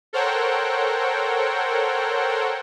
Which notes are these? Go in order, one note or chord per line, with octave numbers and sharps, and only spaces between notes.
A4 A#4 C5 C#5 F#5 G5